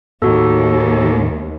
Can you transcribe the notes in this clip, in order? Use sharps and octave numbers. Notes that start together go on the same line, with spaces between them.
D#2 A2 F#4 A4